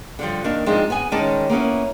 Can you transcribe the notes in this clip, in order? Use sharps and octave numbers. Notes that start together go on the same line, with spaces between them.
D3 F3 G3
D#3 A#3 D4
F3 G#3 C4 D4 D#4
B3 G#5
D#3 G#3 C#4 D5 A5
A#3 B3 C#4 E4